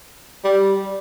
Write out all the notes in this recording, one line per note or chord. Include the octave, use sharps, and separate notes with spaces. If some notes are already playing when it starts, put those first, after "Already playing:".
G3